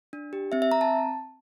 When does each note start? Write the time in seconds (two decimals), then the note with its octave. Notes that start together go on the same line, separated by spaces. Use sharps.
0.13 D4
0.33 G4
0.52 C4 E5
0.62 E5
0.72 C4 A#5
0.81 A5